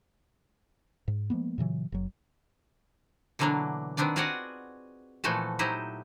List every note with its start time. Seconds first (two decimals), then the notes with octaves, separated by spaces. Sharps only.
1.08 G#2
1.30 F3 G#3 A#3 B3
1.58 A#2 C#3 E3 F#3
1.92 F#1 F#3
3.39 B2 D3 E3 F#3 A#3 D4
3.97 D#3 B3 C4 D4 D5
4.16 F4 F#4 G#4 D5 D#5 F#5
5.24 A#2 E3 F3 A3 F#4 A4
5.59 F#3 D#4 E4 G4 C5 D#5